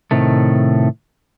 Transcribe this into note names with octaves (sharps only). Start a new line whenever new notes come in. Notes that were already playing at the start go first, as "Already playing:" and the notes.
A2 C3 D#3 A3